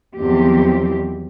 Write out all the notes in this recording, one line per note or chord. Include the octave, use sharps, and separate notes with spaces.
E2 D#3 F3 F#3 C4 G4